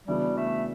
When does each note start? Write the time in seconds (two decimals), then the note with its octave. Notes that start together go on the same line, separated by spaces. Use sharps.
0.07 C#3 E3 G3 B3 D4 F#4
0.37 A3